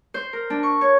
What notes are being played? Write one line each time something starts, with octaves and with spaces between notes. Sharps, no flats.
C5
A#4
D4
C#6
C#5